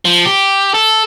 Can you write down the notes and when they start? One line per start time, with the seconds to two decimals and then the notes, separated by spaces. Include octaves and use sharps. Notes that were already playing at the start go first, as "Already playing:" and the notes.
0.05 F3
0.26 G4
0.74 A4